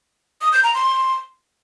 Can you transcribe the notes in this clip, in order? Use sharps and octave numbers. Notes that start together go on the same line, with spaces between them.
D#6
G6
A#5
C6